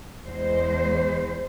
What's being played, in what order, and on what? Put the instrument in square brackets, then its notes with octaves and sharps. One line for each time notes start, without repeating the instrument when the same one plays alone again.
[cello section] E2 G#3 C5